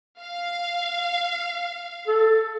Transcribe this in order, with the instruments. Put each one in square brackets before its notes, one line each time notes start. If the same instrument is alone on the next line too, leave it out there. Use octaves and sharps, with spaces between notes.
[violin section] F5
[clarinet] A4